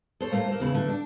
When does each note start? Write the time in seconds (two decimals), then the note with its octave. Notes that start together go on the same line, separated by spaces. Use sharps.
0.20 A4 C5 C#5
0.32 A3 A#3 C5
0.48 A#3 C5
0.60 E2 C#3 E4
0.74 F#2 D3 E3 A3
0.89 D4